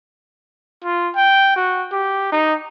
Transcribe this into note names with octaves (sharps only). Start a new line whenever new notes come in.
F4
G5
F#4
G4
D#4